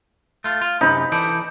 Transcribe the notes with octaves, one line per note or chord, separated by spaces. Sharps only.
A3 F4
F4
F#2 C3 D#4 B5
E3 A4 D5